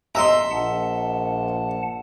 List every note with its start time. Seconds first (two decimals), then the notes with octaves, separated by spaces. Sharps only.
0.15 D#5 E5 A#5 C6
0.51 A#1 F#5 A5